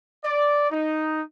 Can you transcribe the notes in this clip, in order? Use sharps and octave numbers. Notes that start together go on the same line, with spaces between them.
D5
D#4